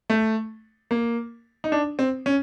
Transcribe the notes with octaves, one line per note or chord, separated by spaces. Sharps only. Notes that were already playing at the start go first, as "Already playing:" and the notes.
A3
A#3
D#4
D4
C4
C#4